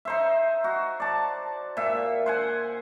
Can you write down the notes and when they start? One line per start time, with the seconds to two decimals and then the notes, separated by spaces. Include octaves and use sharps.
0.05 D#4 C5 E5
0.64 F#4
1.00 D5 A5
1.77 A#2 E5
2.26 C5 F#5 G#5